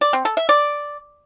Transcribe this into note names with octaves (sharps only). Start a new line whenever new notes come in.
D5
C4
A4
E5
D5